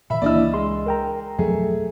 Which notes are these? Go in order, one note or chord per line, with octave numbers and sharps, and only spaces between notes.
A#2 D#3 E5 B5
C#2 E3 A#3 D4 E4 D5 D#5 E6
G#3 C6
A#4 G5 A#5
B1 F2 F3 F#3 A3 G#4